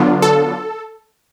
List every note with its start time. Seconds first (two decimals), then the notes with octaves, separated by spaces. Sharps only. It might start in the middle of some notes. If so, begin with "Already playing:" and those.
Already playing: D3 F#3 B3 D4 F4
0.22 A4